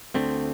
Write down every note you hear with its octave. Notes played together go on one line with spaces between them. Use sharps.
D2 D3 A3 C4